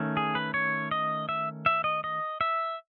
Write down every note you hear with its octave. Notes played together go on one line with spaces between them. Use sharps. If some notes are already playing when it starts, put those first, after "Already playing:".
Already playing: D#3 A3 C#4
G#4
B4
C#5
D#5
E5
E5
D#5
D#5
E5